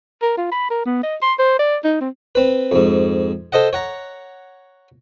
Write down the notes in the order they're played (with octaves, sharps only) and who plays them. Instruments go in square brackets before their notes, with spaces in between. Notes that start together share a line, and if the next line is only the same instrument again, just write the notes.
[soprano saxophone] A#4
F4
B5
A#4
B3
D#5
C6
C5
D5
D#4
C4
[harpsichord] C4 B4
F2 G#2
A4 C5 D#5 F#5
C#5 F#5 A#5